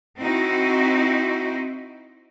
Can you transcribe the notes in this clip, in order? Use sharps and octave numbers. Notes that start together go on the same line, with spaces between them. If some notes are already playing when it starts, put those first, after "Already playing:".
C4 D#4 E4 F#4